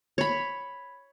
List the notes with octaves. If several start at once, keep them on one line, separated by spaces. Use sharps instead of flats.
C#5 B5